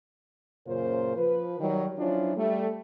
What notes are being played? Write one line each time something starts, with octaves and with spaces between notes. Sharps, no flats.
F#2 A#2 C#3 F4 A#4 C5
F3 B4
D#3 F#3 G3
F3 F#3 C#4 D4 E4 F4
G3 A3